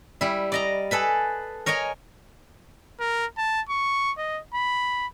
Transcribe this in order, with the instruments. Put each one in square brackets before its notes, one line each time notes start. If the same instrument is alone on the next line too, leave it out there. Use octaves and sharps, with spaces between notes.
[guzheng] G3 E4
D5 D#5 A#5
G#4 A4 B4 B5
A#4 C#5 D#5 G#5 A#5
[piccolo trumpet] A#4
A5
C#6
D#5
B5